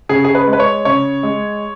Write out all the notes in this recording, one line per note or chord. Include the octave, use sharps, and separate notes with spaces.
C#3 G#4
G#4
B4
G#3
B4
C#5
C#3 C#5
G#3